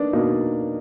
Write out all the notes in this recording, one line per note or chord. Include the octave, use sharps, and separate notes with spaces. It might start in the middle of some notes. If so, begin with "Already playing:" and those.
Already playing: A#3 D4 D#4 B4 D5
B2 A#3 D#4